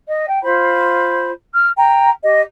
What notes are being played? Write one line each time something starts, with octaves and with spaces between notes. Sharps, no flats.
D#5
G5
F4 C5 B5
F6
G5 A#5
G4 D#5